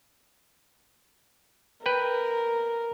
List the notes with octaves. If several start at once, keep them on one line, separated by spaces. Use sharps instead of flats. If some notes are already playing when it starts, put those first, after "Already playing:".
A#4 B4 G5